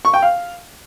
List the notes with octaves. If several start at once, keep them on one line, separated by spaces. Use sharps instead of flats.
C#6
G5
F5